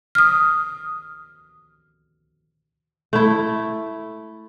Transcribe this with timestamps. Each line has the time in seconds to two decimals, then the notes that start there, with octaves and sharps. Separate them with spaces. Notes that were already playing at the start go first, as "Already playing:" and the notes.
0.15 D#6 F6
3.13 A3 E4